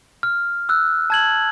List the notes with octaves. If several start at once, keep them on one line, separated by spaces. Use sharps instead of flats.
F6
E6 F#6
A5 G#6 F#7